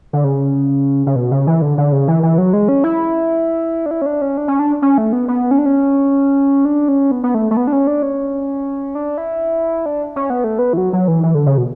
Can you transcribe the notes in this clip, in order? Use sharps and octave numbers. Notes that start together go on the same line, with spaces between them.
D3
C#3
C#3
B2
C#3
E3
D3
D3
C#3
E3
E3
F#3
G#3
C#4
E4
D4
E4
C#4
D4
C#4
D4
C#4
D4
C#4
A3
B3
B3
C#4
D4
C#4
D4
C#4
B3
B3
A3
A3
B3
D4
C#4
D4
C#4
D4
E4
D4
C#4
B3
A3
B3
E3
F#3
F#3
E3
E3
D3
C#3
B2